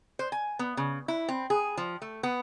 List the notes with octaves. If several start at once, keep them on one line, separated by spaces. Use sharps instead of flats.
C5
G#5
B3
C#3
E4
C4
G#4
F3
A3
B3